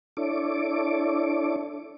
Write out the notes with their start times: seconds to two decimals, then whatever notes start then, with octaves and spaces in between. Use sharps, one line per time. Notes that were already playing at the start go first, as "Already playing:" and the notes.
0.17 D4 E4 A4 C#5 D6